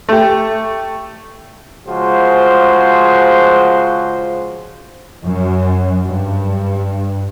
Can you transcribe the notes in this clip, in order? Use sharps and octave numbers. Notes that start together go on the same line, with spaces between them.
A3 G4
C#3 F3 G#3 F#4 C5
F#2
G2